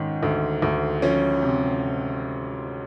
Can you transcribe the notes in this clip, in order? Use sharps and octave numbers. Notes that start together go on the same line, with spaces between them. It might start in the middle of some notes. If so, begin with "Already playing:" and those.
Already playing: G#2 D#3 C#4
D2
D2
F3 C#4
C3